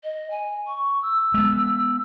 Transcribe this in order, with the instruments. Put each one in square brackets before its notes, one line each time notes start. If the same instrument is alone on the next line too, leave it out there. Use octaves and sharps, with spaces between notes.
[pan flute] D#5
G#5
C#6
E6
[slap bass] G#3 B3